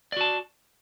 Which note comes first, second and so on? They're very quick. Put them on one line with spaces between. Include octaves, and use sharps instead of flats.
D5 F#4 A5